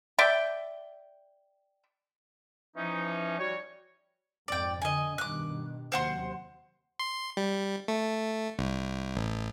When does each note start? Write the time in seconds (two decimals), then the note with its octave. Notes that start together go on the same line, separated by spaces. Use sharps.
0.19 D5 E5 G5
2.76 E3 F3 C#4 D#4
3.39 G3 F#4 C#5
4.48 F2 G#2 D5 G5
4.82 D3 D#5 G#5
5.18 G2 B2 D#3 D6 F#6
5.92 D#2 C3 F#3 C5 F#5 C6
6.99 C6
7.37 G3
7.88 A3
8.59 C2
9.16 A1